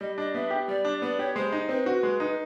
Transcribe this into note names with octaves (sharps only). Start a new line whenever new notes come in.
G3 D#5
D4 D#5
B3 E5
G4
G3 D5
D4
B3 D5
G4 C#5
G#3 C5
D#4
C4 B4
F#4
G#3
D#4